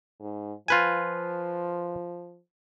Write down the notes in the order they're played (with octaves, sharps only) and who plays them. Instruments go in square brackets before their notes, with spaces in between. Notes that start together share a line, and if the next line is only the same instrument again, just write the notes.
[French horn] G#2
[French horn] F3 [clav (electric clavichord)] F4 B4 G#5